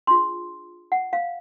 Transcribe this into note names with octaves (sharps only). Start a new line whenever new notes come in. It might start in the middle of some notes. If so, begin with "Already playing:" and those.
D4 F4 G#4 C6
F#5
F5